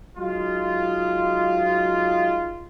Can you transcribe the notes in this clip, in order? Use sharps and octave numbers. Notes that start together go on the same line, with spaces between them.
F#3 G#3 D#4 F4